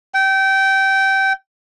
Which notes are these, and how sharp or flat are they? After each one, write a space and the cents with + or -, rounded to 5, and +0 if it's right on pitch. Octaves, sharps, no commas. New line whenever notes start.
G5 -20